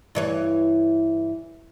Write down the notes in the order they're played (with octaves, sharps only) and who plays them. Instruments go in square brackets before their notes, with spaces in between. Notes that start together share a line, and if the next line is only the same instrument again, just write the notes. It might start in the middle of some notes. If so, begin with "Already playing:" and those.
[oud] G2 E3 C#5